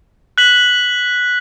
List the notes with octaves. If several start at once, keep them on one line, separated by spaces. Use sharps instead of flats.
F#6 B6 F#7